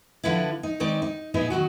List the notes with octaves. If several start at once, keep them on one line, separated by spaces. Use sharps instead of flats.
D3 F3 B3 E4
D#4
D#3 G#3 C4 D#4 D5
D#4
A#2 B3 D#4 E4 G#4 G#5
D#3 E3 F#3 F#4